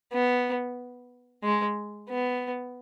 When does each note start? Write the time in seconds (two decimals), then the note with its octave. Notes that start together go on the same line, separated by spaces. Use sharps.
0.12 B3
1.44 G#3
2.10 B3